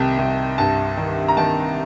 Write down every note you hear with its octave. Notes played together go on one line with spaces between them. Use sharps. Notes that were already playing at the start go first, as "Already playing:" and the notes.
Already playing: C2 C3 D#3 G5 A5
C2
G2 A5
D#3
A#5
D#3 A5